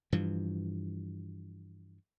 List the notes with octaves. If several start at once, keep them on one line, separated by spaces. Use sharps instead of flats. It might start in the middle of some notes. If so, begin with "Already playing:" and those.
G2 E3 F3